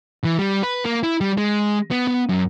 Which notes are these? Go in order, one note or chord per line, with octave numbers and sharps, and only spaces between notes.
E3
G3
B4
A#3
E4
G3
G#3
B3
B3
F#2